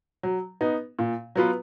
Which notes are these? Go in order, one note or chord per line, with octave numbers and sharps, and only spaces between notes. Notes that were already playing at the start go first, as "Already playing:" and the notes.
F#3
B3 D#4
A#2
F#3 B3 F4 B4